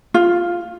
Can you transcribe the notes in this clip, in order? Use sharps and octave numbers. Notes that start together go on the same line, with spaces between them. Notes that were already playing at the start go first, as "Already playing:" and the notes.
F4